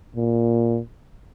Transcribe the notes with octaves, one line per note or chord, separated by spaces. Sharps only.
A#2